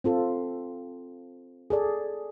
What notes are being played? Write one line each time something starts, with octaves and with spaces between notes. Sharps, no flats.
C4 F4 A4
G#4 A4 D5